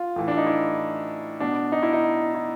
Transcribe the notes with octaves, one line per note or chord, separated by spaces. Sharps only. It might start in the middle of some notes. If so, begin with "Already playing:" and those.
Already playing: F4
A2 E3
D4
D#4
E4
B2 D4
D#4
E4
D#4
E4